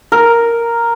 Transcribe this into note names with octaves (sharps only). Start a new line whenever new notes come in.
A#4